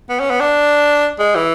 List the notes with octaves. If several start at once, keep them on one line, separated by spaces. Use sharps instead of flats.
B3
C#4
B3
D4
G#3
E3